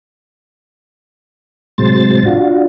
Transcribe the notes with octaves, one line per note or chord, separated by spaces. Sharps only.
A2 C3 F#3 G#3 C5 A6
D4 F4 F#4